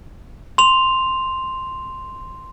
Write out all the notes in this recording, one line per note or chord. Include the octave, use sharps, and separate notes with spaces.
C6 F7